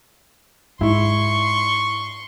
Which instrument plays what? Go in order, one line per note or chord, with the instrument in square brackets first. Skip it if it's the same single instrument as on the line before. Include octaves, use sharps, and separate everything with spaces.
[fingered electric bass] G#2 [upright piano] E4 [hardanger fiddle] C6 C#6